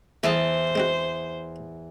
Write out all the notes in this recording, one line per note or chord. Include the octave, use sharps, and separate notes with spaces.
E2 A3 G#4 C5 E5 A5
G#3 C4 F#4